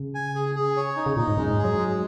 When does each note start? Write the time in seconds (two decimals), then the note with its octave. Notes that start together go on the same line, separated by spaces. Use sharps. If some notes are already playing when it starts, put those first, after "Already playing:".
Already playing: C#3
0.15 G#5
0.35 G#4
0.55 G#4
0.77 C#5
0.96 D#4
1.06 C#3
1.17 A#2 D#4
1.28 G#2
1.37 F#2 G#3
1.51 G#2
1.58 G#4
1.65 F#3
1.78 G#3